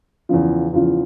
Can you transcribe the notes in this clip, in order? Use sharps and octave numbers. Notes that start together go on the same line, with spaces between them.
E2 C#3 F3
E2 C#3 F3 F4